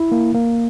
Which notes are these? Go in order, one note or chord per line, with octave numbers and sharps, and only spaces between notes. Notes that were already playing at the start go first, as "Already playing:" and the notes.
Already playing: E4
A#3
A#3